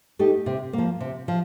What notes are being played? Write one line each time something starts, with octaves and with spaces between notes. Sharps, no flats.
A3 D#4 G4
C3
F3 A#3
C3
F3